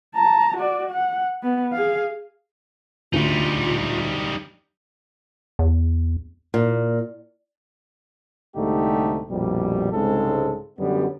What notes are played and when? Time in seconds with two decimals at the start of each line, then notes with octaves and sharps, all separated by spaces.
0.15 A5 A#5
0.57 F#4 D5
0.90 F#5
1.43 B3
1.73 G#4 F5
3.13 D2 G3 D#4 F4
5.59 E2
6.54 A#2
8.56 C2 G#2 D3 A3 D#4 G4
9.30 A#1 F2 B2 G3
9.92 C2 G#2 C#3 G#3 C4 A4
10.78 F#2 D3 F#3 G3 B3